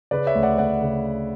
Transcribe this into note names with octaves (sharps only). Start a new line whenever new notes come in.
C#3 B4 D5
C#5 E5
D2
D5 F#5
D2 D5 F#5
C#3